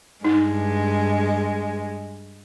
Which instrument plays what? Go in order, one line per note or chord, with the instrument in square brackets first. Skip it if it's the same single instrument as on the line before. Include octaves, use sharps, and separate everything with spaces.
[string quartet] G2 G#3 [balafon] D#4